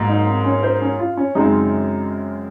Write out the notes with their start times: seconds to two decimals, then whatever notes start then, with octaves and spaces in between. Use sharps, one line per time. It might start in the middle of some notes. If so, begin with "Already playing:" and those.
Already playing: G#2 F#3 A#3
0.09 D#4
0.27 C4
0.45 C#4
0.63 C5
0.82 C#4
0.99 F4
1.17 C#4
1.35 F#2 C#3 G#3 C4 D#4